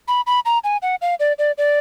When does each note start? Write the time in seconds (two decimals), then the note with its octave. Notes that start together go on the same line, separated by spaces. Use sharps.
0.08 B5
0.27 B5
0.45 A#5
0.64 G#5
0.82 F#5
1.02 F5
1.20 D5
1.39 D5
1.58 D5